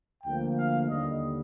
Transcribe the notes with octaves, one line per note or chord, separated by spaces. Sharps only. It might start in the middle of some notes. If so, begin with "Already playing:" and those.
D2 D3 F3 A#3 G5
F5
D#2 D3 G3 D#5